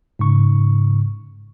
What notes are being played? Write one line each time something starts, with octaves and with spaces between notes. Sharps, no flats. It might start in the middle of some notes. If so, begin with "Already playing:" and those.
G#2 C#3 C#6